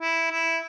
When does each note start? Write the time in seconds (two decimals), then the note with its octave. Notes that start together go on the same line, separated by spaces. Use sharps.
0.01 E4
0.31 E4